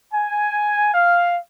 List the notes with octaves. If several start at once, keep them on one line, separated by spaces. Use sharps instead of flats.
G#5
F5